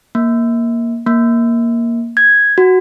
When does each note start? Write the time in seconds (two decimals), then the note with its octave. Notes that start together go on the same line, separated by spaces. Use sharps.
0.15 A#3
1.07 A#3
2.17 G#6
2.58 F#4